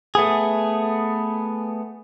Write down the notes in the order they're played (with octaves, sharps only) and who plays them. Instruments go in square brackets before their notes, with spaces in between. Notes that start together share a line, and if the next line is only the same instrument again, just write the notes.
[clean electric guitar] A3 B3 G#4